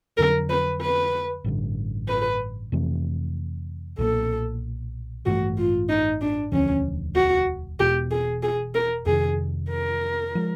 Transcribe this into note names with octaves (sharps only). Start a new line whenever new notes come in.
F2 D3 F#3 A#4
B4
B4
A1 G2 D3
B4
F2 C3 E3 A3
B1 A#2 F3 A#3 A4
A1 G2 E3 A3 F#4
F4
D#4
D4
E1 D2 D3 F3 C#4
F#4
E1 E2 B2 G4
G#4
G#4
A#4
F2 C3 D#3 G#4
A#4
F3 G#3